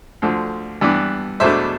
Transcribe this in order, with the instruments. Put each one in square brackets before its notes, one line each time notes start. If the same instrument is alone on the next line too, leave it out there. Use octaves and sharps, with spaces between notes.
[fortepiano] D2 D3 F3
G2 E3 B3 D4
E2 B2 A3 D4 C5 E5